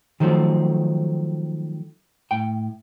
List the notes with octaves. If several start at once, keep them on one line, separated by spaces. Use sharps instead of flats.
D#3 F3 F#3 A3 C4
A2 G5